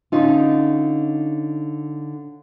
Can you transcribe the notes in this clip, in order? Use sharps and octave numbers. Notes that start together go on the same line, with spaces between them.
D3 C#4 D#4 F4